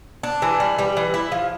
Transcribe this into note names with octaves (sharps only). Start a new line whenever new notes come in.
D4
E3
G3
G3
E3
E4
F3